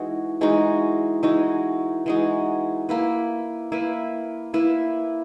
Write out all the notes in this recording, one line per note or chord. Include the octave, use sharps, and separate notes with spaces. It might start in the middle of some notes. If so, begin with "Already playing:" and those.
Already playing: E3 G#3 D#4 F#4
E3 G#3 D#4 F#4
E3 G#3 D#4 F#4
E3 G#3 D#4 F#4
A#3 E4 B4
A#3 E4 B4
A#3 E4 B4